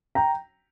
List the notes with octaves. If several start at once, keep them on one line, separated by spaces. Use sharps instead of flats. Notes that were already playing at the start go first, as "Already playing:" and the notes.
G5 A#5